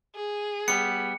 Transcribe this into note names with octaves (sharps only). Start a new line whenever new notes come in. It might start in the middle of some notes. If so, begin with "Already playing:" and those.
G#4
G3 B3 C#7